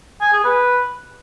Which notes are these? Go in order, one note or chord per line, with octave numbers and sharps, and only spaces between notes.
G#5
G#4
B4